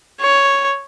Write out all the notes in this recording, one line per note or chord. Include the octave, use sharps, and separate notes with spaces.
C#5